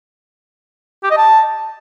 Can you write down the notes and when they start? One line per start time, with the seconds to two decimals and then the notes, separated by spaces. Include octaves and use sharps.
1.04 G4
1.11 D#5
1.18 A5